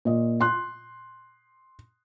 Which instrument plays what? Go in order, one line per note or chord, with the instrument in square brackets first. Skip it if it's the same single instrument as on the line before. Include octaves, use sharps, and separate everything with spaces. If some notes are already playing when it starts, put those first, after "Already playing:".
[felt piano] A#2 D#5
C6 F#6